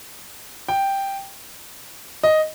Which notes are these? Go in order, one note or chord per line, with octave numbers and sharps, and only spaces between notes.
G5
D#5